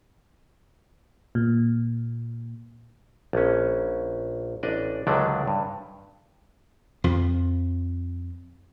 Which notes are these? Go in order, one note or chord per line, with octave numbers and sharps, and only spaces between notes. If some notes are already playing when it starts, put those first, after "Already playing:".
A#2
A#1 C#4
A1 D4 D5 D#5
C#2 D3 D#3 F#3 D4 D5
G2
F2 F3